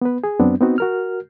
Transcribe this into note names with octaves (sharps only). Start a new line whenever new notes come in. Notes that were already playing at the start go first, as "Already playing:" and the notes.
B3 B4
G#4
F#2 F#3 B3 C4 D4
B3 C4 D#4 F#4
F#4 A#4 F6